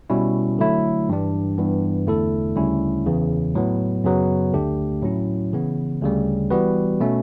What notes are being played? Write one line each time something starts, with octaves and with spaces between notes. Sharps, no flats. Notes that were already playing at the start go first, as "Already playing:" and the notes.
B2 G3 C#4 E4
D3 F#3 A3 E4
G2 E3 G3 D4
G2 E3 B3
E2 D3 A3 E4 A4
D2 C#3 G3 C#4 E4
E2 C#3 E3
A2 F#3 B3
F#2 C#3 F#3 B3
D2 D3 A3 D4 G4
A2 F#3 C#4 E4
C#3 E3 B3
D2 C#3 G3
E3 G3 B3 F#4 B4
B2 A3 C#4